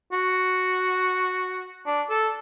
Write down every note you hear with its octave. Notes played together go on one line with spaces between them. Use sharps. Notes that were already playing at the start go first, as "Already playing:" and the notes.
F#4
D4
A4